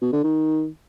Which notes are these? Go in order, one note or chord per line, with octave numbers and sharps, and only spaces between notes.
B2
D3
D#3